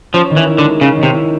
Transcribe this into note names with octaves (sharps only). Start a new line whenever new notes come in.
F3 C#4
D#3
E3
E4
D3
G#3
C#3 C#4
D#3
C3
E4